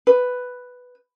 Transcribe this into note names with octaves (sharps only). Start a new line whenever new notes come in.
B4